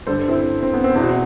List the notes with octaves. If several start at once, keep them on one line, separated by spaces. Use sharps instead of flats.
G2 D3 A4 C5
C4 E4
C4
B3
C4
E2 B2 C4 E4
F#4
E4